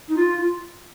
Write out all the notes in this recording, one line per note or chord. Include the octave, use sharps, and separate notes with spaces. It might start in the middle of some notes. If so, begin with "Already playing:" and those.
D#4
F4